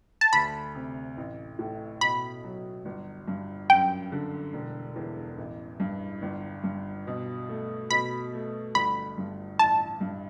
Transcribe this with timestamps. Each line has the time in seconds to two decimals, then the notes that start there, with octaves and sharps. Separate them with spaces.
0.21 A5
0.33 D2 B5
0.75 C3
1.17 A1
1.59 A2
2.01 B2 B5
2.44 F#3
2.85 G1
3.28 G2
3.70 F#2 G5
4.12 D3
4.53 E1
4.96 E2
5.38 A1
5.80 G2
6.22 G1
6.64 G2
7.07 B2
7.49 A3
7.90 B2 B5
8.33 A3
8.75 G1 B5
9.18 G2
9.59 A1 A5
10.01 G2